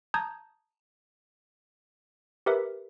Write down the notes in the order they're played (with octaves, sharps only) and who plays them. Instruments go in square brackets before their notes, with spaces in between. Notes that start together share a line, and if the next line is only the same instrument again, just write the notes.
[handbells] A5 A#5 D#6 G6 G#6
G4 A#4 B4 E5